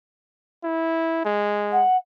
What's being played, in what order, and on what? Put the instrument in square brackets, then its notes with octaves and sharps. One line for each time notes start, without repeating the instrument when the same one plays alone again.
[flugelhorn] E4
G#3
[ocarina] F#5